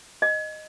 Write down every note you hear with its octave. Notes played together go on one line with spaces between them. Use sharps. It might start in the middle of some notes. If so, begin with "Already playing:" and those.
D#5